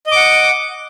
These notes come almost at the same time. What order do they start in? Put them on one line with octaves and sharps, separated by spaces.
D#5 D6 F#5